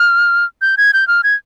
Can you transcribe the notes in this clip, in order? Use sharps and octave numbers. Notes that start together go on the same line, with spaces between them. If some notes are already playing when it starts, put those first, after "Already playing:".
Already playing: F6
G6
G#6
G6
F6
G#6